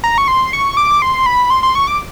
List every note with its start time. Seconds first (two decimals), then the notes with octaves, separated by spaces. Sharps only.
0.04 A#5
0.18 C#6
0.28 C6
0.53 C#6
0.77 D6
1.02 C6
1.26 B5
1.50 C6
1.63 C6
1.75 C#6
1.87 D6